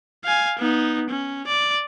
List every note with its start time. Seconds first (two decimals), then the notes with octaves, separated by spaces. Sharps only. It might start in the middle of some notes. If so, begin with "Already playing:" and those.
0.24 F5 G#5
0.59 B3 D#4
1.10 C#4
1.47 D5